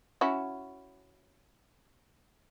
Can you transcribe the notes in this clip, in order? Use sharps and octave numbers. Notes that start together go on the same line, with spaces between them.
C#4 E4 F#4